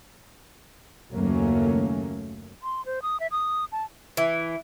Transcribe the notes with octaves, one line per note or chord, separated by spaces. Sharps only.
F#1 D#2 F#3 A3 A#3 C#4
C6
C5
D#6
E5
D#6
A5
E3